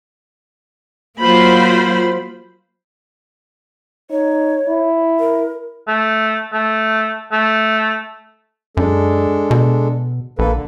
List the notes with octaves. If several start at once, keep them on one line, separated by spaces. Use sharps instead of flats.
F#3 A#3 F4 C5 B5
D#4 C#5
E4
A#4
A3
A3
A3
F#2 G#3 D4 A4
B2
A#1 A#3 A4 B4
D3